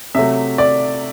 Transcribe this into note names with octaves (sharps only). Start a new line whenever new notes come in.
C3 F#3 A3 E5
D5